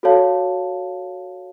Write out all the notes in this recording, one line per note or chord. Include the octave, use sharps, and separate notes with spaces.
F#4 A4 C#5 F5 A5